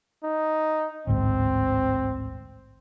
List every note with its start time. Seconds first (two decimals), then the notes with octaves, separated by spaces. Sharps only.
0.24 D#4
1.07 A1 D2 G#2 C4